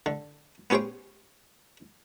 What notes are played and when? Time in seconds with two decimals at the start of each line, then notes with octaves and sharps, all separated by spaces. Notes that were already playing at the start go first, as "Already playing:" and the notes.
0.06 D3
0.70 B3 C#4 G4 G#4 C5 G5